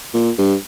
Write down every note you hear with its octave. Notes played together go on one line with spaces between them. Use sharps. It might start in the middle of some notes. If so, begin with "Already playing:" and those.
A#2
G2